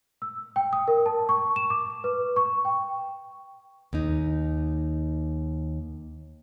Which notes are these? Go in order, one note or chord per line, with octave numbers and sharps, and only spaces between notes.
E6
G5
D#6
A#4
A5
C#6
E7
D6
B4
C#6
G5
D#2 D#4